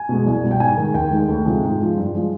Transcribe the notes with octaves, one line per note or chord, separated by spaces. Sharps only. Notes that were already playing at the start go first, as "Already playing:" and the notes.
Already playing: G#5
B2 G#3
C2
B2 G3
G5
G#2 G#5
D#3 G#3
D#2 G5
D#3 G#3
D2
C3 F3 G#3
G#2
F3 G#3
G2
F3 G#3